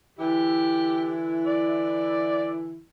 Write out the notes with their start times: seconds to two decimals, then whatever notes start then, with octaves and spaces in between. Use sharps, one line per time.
0.19 D3 E3 E4 G4
1.46 D5